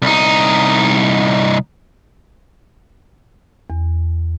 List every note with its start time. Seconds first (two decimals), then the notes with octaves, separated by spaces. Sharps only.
0.02 C2 D#4
3.70 E2